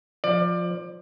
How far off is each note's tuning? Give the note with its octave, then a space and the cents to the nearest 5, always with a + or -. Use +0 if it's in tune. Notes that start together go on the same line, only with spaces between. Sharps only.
F3 +10 D5 +25